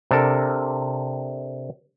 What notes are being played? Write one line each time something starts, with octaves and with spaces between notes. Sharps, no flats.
C3 D4 A4 A#4